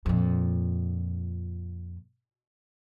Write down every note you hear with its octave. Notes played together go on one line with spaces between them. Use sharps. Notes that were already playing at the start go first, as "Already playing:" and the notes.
F2 A#2